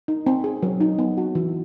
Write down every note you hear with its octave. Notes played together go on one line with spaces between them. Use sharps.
D#4
C4
G#4
F#3
D#4
B3
F#4
E3